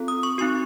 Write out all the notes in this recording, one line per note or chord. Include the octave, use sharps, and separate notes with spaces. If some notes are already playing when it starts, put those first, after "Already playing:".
Already playing: C4 F4 A4
D#6
C#6
C4 D#4 F#4 C#6